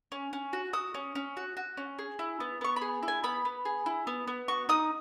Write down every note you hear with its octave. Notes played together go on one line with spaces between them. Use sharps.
C#4
C#4
F#4
F#4 D#6
C#4
C#4
F#4
F#4
C#4
G#4
E4
B3
B3 C#6
B5
G#4
E4
G#5
B3 B5
B3
G#4
E4
B3
B3
F#4 C#6
D#4 D#6